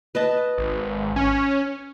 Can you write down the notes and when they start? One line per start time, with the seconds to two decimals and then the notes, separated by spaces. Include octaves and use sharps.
0.15 B4 D#5 A5
0.58 G#1
1.16 C#4